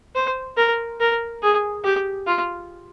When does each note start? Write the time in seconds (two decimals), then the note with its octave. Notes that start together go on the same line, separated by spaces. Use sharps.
0.15 C5
0.57 A#4
1.00 A#4
1.42 G#4
1.84 G4
2.27 F4